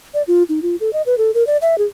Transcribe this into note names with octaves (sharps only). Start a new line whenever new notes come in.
D5
F4
D#4
F4
A4
D#5
B4
A4
A#4
D5
E5
G#4